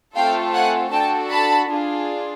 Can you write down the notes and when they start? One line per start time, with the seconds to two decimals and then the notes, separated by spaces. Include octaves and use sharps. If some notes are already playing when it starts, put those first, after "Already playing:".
0.15 A3 C4 F4 A4 F5 G5
0.55 F#5 G#5
0.92 D4 F#4 A4 G5 A5
1.31 A5 B5
1.69 D4 F4 G#4